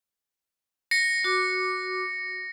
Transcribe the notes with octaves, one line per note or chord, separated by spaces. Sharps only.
A#6 C#7
F#4 D6